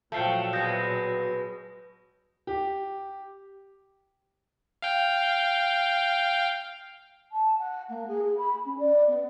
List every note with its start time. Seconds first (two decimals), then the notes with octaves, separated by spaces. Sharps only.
0.12 A#2 F3 F#3 A3 F5 G5
0.53 B2 G#3 D#6 G6 A#6
2.47 G4
4.82 F5 G5
7.31 A5
7.57 F#5
7.88 A#3
8.07 G#4
8.22 G#4
8.37 B5
8.65 C#4
8.78 D5
9.07 B3